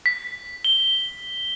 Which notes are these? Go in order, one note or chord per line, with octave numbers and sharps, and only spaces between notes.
B6
G7